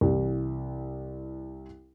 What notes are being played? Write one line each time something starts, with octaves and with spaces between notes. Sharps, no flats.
C2 E3 G4